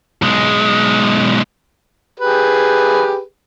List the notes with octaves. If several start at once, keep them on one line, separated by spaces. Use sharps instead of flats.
B1 G#3
G4 G#4 B4